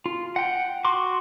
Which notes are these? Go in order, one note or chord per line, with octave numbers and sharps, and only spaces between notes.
F4
F#5 G5
F#4 C6 D6